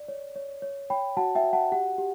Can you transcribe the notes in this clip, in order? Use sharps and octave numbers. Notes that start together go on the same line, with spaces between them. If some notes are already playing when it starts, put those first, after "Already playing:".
Already playing: D5
C#5
C#5
C#5
C#5 G5 B5
F#4 F#5 A5
E5 G5
F#4
F#5 A5
G4 F#5
G4